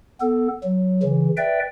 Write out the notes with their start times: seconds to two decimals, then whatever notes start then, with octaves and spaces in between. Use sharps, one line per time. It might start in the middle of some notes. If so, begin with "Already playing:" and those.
0.21 B3 A4
0.63 F#3
1.03 C#3 E3
1.37 B4 D5 E5 G5